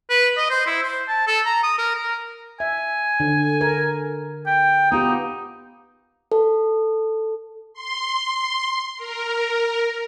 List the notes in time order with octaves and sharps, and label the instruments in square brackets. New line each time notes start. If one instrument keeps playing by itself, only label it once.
[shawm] B4
D#5
C5
E4
C5
A5
A4
A#5
D#6
A#4
A#4
[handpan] E5 [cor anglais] G#5
[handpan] D3
A#4
[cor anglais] G5
[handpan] B3 F4 G4 [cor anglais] D#4
[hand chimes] A4
[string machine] C6
A#4